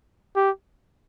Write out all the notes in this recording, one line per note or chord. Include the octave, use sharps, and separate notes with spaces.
G4